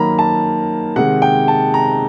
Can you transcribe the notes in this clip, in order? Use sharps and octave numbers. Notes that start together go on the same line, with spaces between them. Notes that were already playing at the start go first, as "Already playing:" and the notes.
Already playing: D#3 F#3 A#3 A#5 B5
A5
C3 D#3 G#3 F#5
G5
A5
A#5